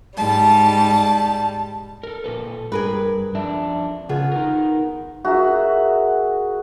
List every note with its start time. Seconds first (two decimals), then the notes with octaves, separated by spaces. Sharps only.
0.16 G#2 G3 A5
2.03 A4 A#4
2.24 A#2 A4 B4
2.72 G2 G#4 A#4 B4
3.35 F2 D4 E5
4.09 C#3 B3 F4 G#4
4.32 D#4 A#4
5.25 F#4 G#4 A#4 E5